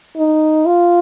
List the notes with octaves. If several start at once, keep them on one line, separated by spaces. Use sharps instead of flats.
D#4
F4